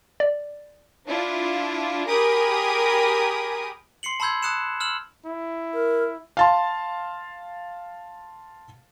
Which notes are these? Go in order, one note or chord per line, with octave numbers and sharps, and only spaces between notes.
D5
D4 E4 F4
G4 G#4 A#4 B5 D#6
C6 C7 C#7 F#7
A5 B5 C6 E6 G6 G#6
A5 D#6 F#6 C#7 E7
E6 F6 E7 F#7
E4
A#4
F5 A5 C6